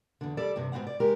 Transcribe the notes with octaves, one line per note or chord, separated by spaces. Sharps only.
E2 D3
G3 A4 D5
E2 G2 C3
G#2 D#3 B3 C4 F#5
D5
G#3 G4 A#4